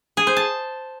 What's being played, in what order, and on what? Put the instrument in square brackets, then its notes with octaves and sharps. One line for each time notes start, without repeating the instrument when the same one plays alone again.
[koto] G#4
C5
A5